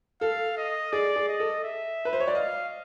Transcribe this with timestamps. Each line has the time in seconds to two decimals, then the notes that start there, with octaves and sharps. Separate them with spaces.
0.21 A4 F5
0.57 D#5
0.93 G#4 D5
1.16 G#4
1.28 D#5
1.40 A4
1.64 E5
2.05 B4
2.13 C5
2.20 C#5
2.27 D5
2.35 D#5 F5